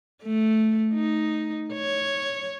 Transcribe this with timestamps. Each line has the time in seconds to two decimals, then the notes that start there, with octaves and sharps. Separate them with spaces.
0.23 A3
0.94 D#4
1.73 C#5